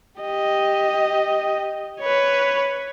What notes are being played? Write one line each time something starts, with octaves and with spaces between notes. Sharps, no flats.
G4 D#5
B4 C#5